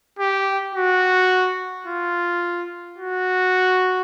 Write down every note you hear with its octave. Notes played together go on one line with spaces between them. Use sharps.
G4
F#4
F4
F#4